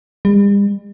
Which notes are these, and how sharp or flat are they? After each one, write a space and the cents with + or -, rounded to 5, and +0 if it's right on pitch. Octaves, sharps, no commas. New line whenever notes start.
G3 +45